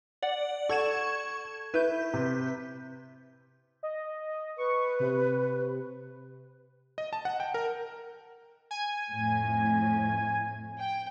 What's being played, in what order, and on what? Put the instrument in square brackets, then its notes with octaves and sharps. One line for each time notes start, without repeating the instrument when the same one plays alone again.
[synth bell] D5 F#5
[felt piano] A4 [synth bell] C#6 G#6 E7
[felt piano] E4 [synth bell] B4 G6
[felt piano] C3
[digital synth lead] D#5
[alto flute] B4 [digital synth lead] C#6
[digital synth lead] C3
[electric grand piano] D#5
A5
F#5
G5
A#4
[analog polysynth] G#5
[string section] F2 A2
G5